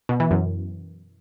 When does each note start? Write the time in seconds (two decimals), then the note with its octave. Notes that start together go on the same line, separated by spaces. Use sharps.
0.09 B2
0.20 E3
0.31 F#2